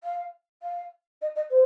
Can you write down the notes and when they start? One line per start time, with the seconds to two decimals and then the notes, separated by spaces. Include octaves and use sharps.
0.03 F5
0.62 F5
1.21 D#5
1.35 D#5
1.50 C5